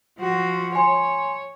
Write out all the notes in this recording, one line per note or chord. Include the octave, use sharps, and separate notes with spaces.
F3 F#4
C#5 G#5 C6